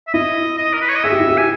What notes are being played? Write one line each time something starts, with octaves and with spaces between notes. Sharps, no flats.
E5
E4 D#5
D#5
A#4
B4
C#5
D#5
G#4 E5
G4
E4
G4
G#5